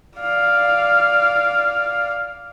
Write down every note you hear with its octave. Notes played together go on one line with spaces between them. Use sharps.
D5 F5